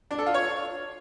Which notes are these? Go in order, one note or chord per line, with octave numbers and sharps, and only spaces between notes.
D4
A4
F4
C#5